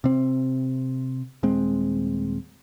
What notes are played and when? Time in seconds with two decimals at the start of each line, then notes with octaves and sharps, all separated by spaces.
0.04 C3 C4
1.43 D#1 G#3 C4